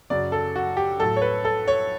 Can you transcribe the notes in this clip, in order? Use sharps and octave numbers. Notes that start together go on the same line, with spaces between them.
F#2 C#3 F#3 D5
A4
F#4
G4
A2 F#3 A4
C#5
B4
A4
C#5